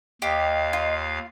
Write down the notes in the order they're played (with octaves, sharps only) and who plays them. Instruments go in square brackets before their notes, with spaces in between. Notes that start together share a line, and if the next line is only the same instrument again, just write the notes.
[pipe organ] D#2 F5 [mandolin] G4 [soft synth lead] D#5
[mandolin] F4